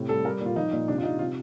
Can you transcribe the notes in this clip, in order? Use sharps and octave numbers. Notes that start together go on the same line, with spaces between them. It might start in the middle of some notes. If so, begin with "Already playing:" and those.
Already playing: A2 C3
G3 A4
G3 A#4
A#2
F4
F3 D#4
A#2
C3 D4
F4
C3 D#4
C3 F4